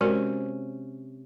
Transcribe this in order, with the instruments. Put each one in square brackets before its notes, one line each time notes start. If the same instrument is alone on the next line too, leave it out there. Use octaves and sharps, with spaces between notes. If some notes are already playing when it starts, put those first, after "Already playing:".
[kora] C3 C#4 [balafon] G#3 F#4 A#4